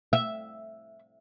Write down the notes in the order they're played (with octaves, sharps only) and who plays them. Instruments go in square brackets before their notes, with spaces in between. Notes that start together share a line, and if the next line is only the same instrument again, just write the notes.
[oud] E5